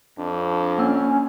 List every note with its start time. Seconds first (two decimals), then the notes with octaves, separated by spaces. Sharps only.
0.18 F2 D4
0.78 A#3 C#4 E6